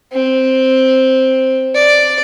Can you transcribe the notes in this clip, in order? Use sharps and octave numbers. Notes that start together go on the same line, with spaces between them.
C4
D5